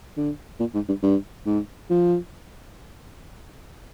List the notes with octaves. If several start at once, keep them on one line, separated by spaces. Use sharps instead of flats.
D3
A#2
G#2
G2
G2
G#2
F3